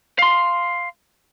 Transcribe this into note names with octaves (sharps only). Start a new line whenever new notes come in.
F5 C6